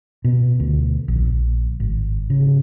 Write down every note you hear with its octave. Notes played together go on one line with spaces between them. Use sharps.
B2
D2
A#1
G#1
C#3